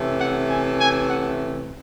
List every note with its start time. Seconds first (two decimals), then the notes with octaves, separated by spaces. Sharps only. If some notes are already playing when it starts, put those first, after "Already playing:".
Already playing: C3 E3 A3 C#4
0.20 F#5
0.49 G#5
0.80 G#5
1.09 F#5